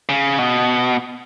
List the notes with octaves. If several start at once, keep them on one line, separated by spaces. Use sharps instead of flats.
C#3
B2